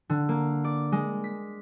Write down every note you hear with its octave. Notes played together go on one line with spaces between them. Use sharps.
D3
A#3
D5
G#3
B6